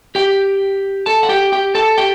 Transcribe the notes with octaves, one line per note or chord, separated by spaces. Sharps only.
G4 G5
A4 A5
F#5
G4 G5
G4 G5
A4 A5
G4 G5